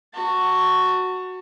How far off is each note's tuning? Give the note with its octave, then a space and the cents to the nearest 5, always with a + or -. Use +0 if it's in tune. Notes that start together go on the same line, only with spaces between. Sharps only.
F#4 +0 A5 +30